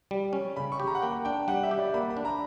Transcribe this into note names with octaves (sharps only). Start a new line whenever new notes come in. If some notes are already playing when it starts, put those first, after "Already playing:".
G3
C#4
C#3 B5
C#6
G4
A#5
F#5
A#3 G5
D4 G5
G3 F#5
E5
G4
D5
A#3 B5
B5
D4
A#5